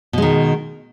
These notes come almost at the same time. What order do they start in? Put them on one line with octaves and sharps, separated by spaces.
B2 G#3 D#3